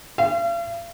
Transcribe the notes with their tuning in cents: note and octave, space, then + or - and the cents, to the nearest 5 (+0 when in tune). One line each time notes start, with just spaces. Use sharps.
F5 -45